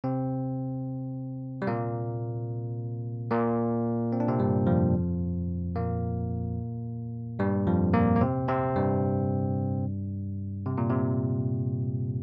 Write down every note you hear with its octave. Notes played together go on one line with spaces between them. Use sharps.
C3 C4
G3
A#2 A#3
A#2 A#3
C4
D4
C3 C4
G2 G3
F2 F3
A#2 A#3
G2 G3
F2 F3
A#2 A#3
A#3
C3 C4
C3 C4
G2 G3
C3
A#2
C3